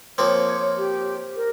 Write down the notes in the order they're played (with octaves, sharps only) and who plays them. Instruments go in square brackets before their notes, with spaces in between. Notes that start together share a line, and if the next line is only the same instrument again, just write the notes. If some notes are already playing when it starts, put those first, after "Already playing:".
[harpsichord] F3 A#3 C4 [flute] C#5
[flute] G4
A#4